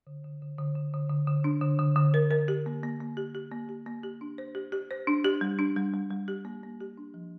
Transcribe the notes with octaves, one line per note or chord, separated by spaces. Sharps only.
D3
D3
D3
D3
D3
D3
D3
D3
D4
D3
D3
D3
A#4
A#4
G4
A#3
A#3
A#3
G4
G4
A#3
G4
A#3
G4
D4
C5
G4
G4
C5
D4
G4
G3
D4
G3
G3
G3
G4
A#3
A#3
G4
D4
F3